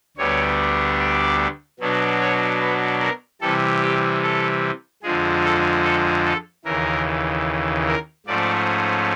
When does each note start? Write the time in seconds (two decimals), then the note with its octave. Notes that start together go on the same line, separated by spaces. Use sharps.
0.17 D2 D3 G3 B3 D4 C#5
0.99 D5
1.80 B2 F#3 B3 D4
2.20 C#5
2.61 B4
3.01 A#4
3.41 C3 E3 G3 A4
3.82 G4
4.22 A4
5.03 F2 D3 F3 G#3 G#4
5.44 A4
5.84 A4
6.25 A4
6.65 D#2 C#3 E3 A#4
7.87 A#4
8.26 G#2 F3 A3 C#4 D5